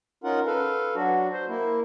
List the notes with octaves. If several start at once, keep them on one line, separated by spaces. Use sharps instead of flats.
C#4 D#4 F4 A#4 F#5
A4 B4 F5
F#3 D4 F#4
C5
A#3 E4